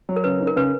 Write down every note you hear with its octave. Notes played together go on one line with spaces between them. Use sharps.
F#3
A#4
C#3 B4
D#4
A#4
C#3 B4